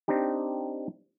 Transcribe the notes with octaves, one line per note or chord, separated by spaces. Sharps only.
C4 D4 D#4 G4